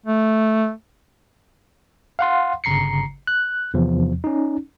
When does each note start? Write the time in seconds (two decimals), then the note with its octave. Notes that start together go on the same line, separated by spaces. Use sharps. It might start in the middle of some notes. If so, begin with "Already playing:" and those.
0.06 A3
2.19 F5 F#5 C6
2.64 G1 C#3 A#5 C7 C#7
3.27 F#6
3.74 E2 C3 F3
4.24 C#4 D#4